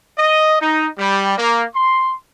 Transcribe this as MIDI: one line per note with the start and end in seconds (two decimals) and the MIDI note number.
0.17 0.55 75
0.60 0.86 63
0.97 1.33 55
1.36 1.63 58
1.74 2.13 84